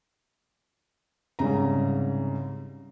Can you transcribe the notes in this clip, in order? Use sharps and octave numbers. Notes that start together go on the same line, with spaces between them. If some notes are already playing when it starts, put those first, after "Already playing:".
C2 G#2 C#3 A#5